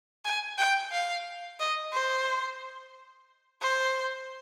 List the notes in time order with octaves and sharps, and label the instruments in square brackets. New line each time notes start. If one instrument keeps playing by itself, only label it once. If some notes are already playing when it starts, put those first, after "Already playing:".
[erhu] G#5
G5
F5
D#5
C5
C5